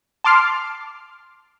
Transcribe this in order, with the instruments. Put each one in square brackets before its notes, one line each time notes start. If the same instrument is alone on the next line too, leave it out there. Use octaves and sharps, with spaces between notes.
[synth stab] A5 C6 D6 F6 C7